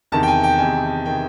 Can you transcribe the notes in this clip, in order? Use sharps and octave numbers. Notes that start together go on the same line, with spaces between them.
E2 C3 D#3 A5
G5
G#5
G5
E2 C3 D#3 G#5
C3 D#3 G5